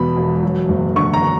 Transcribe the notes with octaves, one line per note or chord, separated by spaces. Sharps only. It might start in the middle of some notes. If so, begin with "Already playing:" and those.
Already playing: E2 B2 B5
E1
F#3
F#1
D3 C#6
A#5
D3